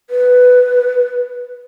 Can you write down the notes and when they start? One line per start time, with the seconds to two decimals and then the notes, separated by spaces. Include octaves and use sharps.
0.10 B4